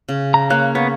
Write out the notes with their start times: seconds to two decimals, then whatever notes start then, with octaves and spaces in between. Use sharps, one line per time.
0.09 C#3
0.34 A#5
0.50 A#3 C#5 F#6
0.75 B3 C#5